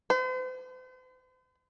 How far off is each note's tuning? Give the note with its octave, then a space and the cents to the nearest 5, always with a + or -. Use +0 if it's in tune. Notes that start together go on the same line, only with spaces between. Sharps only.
C5 -45